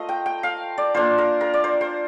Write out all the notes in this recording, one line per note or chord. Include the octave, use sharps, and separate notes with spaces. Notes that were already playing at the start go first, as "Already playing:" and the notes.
Already playing: A3 F4 A#4 C5 D#5
G5
G5
F5
D5
A#3 D4 F4 C5
A#4
A#4
D5
C5
C5